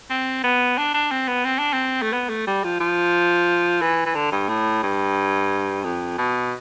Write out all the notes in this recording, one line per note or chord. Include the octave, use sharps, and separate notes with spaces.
C4
B3
D4
D4
C4
B3
C4
D4
C4
A3
B3
A3
G3
F3
F3
E3
E3
D3
G2
A2
G2
F2
B2